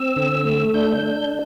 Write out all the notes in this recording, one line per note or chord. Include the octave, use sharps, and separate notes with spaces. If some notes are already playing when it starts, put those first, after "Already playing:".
Already playing: C4 E6
D3
A3
D4 G6
D4